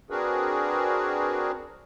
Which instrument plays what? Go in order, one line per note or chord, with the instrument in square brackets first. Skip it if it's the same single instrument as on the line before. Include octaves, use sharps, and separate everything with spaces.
[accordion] C4 D4 F#4 G#4 A#4 B4